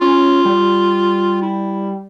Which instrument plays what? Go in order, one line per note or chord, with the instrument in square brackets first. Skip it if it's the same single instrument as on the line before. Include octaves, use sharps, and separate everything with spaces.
[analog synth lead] C#4 [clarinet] F4
[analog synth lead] G3
[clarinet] E4